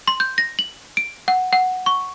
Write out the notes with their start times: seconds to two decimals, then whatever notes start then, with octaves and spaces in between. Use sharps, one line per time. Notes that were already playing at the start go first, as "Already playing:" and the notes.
0.08 C6
0.20 G6
0.38 A#6
0.59 F#7
0.97 D7
1.28 F#5
1.53 F#5
1.86 C#6